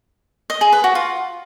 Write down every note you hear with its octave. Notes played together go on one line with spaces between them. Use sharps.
D#5
G#4
B4
F#4
F4